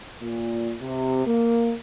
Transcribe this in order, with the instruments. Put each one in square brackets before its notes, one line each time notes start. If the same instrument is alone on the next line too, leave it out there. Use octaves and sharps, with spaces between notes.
[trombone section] A#2
C3
A#3